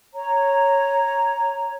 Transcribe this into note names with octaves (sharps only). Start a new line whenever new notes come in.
C#5 A#5